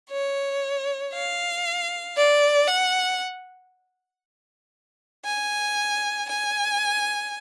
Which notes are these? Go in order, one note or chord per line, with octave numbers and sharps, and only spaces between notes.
C#5
F5
D5
F#5
G#5
G#5